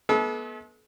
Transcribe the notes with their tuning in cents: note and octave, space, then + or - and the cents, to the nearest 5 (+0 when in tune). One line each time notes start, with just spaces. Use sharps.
G#3 +45 B3 -30 A4 -40